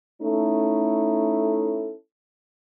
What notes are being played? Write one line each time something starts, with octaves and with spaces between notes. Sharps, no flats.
A3 C#4 D#4 E4 A4